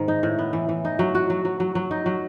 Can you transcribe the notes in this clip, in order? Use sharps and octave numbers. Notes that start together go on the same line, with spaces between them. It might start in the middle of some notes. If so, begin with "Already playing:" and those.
Already playing: G#2 D#3
D#4
A2
B3
E3
E3
D#4
F#3
F#4
F#3
F#3
F#3
F#3
D#4
F#3